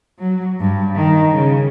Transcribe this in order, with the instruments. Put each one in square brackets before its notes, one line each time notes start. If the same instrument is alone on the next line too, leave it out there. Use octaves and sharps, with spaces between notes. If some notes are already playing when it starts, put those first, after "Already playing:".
[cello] F#3
G2
D#3
C#3